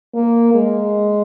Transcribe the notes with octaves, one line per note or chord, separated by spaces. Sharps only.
A#3
G#3